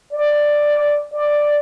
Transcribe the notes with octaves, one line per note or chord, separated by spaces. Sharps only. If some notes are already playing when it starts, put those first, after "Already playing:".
D5
D5